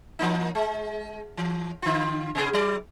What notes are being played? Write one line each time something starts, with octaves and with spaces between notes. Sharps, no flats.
E3 A#3 D#4
G#3
E3
D3 F4
C3 B3 G#4
F#3 D5